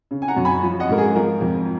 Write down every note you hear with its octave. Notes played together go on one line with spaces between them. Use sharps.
C#3
G#5
F#5 A#5
F#2
G#5 B5
F3
D#5 F#5
G#2 A#4
G#4
F3 A#4
F2